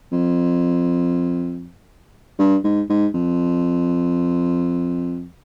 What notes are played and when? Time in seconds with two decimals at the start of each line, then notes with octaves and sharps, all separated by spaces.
0.12 F2
2.39 G2
2.64 G#2
2.90 G#2
3.14 F2